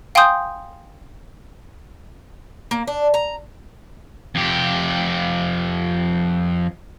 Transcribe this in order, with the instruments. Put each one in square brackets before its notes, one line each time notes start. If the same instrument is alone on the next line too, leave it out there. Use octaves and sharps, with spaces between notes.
[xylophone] F5 G5 G#5 C6 D#6 G6
[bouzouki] A#3
D4
A#5
[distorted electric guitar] F2 G4